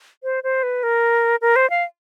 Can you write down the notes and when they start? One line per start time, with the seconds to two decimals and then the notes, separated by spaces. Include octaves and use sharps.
0.23 C5
0.44 C5
0.63 B4
0.83 A#4
1.42 A#4
1.56 C5
1.70 F5